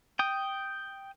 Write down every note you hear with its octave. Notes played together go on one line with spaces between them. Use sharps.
G5 D#6